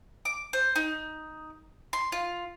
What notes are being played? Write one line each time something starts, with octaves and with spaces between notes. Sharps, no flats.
D6
C5
D#4
C6
F4